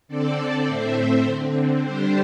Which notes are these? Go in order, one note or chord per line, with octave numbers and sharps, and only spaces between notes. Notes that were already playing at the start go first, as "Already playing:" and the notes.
D3 C4 A4 D5
A2 A3 C4 C5 E5
D3 C4
D3 G3 D4 G4 C5